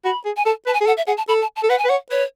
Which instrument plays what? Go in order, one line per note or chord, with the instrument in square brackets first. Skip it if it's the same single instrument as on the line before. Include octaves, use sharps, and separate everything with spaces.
[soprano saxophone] F#4 [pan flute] B5
[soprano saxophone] G#4
[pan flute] G#5
[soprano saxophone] A4 [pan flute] A5
[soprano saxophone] B4 [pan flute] A5
[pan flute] G#5
[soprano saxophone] G#4
[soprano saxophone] A4 [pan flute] F#5
[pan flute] E5
[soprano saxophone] G#4 [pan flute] F#5
[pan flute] A5
[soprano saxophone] A4 [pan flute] B5
[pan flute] A5
A5
[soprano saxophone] A4
[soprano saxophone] B4 [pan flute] F#5
[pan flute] G#5
[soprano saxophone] B4
[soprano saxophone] C#5 [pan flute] F#5
[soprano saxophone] B4 [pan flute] C#5